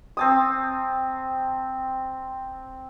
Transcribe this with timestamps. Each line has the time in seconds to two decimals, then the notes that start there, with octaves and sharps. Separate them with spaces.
0.17 C4 A5 D#6